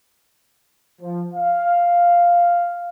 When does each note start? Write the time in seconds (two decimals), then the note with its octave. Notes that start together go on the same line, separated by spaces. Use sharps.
1.01 F3
1.34 F5